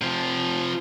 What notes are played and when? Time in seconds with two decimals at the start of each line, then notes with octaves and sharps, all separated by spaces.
0.02 C3 F3